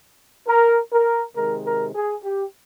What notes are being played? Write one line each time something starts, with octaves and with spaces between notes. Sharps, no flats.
A#4
A#4
C3 D#3 G#3 A#4
A#4
G#4
G4